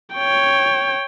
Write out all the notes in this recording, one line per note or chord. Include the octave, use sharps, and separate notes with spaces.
C#5 G5